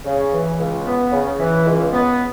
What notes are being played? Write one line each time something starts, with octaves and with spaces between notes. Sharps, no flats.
C#3
E3
C#2
B3
C#3
E3
C#2
B3